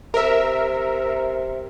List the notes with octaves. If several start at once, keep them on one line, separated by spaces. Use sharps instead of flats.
C3 A#4 E5